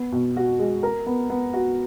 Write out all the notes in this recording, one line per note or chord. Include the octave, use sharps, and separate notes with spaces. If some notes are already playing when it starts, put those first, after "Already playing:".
Already playing: B3
B2
F#4
G#3
A#4
B3
B3
F#4